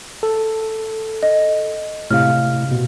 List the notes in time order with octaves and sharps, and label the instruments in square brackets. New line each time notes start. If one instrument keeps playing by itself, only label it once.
[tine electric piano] A4
[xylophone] D#5
[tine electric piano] A2 C3 [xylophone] F5 F6
[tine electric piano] B2